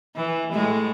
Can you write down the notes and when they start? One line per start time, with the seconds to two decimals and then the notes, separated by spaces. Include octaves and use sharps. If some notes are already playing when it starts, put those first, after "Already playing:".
0.16 E3
0.52 A2 G#3